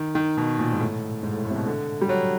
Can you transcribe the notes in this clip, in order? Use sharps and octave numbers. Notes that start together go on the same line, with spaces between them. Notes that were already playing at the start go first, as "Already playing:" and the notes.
Already playing: D#3
D#3
B2
A#2
G#2
A2
G#2
A2
A2
C3
B2
D3
G3
F#3